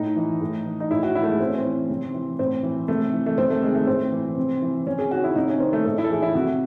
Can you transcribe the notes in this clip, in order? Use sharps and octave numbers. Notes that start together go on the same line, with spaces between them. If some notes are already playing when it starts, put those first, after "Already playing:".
Already playing: A2 D#4
E3
A2
E3
D#4
A2 E4
F#4
E3 E4
A3
G#3
A2 C4
C#4
C4
E3
C3
E3
A2 C4
E3
C3 A3
E3
A3
C3 C4
A3
D#3 G#3
A3
A2 C4
E3
C3
E3
C3 C#4
G#4
D#3 F#4
E4
C3 D#4
C#4
D#3 C4
A3
A2 A3
E4
A4
E3 G#4
E4
C3 F#4